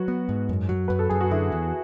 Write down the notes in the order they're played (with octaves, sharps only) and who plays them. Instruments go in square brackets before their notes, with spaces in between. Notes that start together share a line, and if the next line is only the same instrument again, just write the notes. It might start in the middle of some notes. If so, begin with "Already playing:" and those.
Already playing: [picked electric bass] F#3 [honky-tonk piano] F#4 B4
[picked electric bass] B3
G#2
F#2
F#3
[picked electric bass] F#2 [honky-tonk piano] B4
[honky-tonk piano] A4
[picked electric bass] F#2 [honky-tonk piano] G#4
[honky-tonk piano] F#4
[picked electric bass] D3 [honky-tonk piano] E4
[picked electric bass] E2